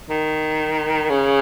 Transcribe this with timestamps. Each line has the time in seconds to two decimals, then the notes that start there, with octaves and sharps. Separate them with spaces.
0.10 D#3
1.10 C#3